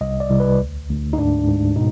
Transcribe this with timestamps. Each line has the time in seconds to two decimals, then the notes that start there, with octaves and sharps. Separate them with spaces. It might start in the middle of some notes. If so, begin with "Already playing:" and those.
0.01 C2 D#5
0.20 D5
0.30 C2
0.40 B4
0.60 D2
0.89 D2
1.13 D#4
1.17 G#2 D4
1.47 G#2
1.76 B2 D#4